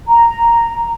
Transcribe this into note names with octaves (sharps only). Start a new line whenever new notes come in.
A#5